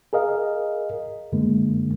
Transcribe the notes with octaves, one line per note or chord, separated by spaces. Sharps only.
G#4 A#4 D#5 F5
F#2 D3 G#3 A#3